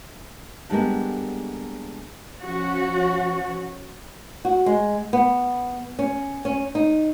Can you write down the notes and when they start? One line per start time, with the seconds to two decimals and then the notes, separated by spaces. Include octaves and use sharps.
0.70 D3 G3 G#3 A#3 B3
2.40 F3 C#4 F#4
4.45 F#4
4.66 G#3
5.13 B3
5.99 C#4
6.45 C#4
6.75 D#4